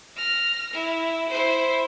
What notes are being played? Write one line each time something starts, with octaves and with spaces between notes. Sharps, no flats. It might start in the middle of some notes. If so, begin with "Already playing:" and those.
F6 A#6
E4
E4 C5